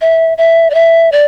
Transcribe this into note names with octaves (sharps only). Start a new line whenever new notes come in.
E5
E5
D5
E5
D5